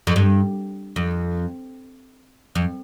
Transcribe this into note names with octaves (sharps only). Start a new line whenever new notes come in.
F2
G2
F2
F2